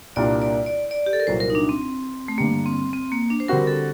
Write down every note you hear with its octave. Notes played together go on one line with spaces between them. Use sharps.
C2 A#2 G3 A#3 D4 D5
D5
D5
D5
G4
A4
A#4
C2 A#2 F#3 C5
A#4
D#4
D4
C4
A3
G2 D3 G3 A#3
C4
C4
A#3
D4
C5
D3 G3 C4 F#4 A#4
A4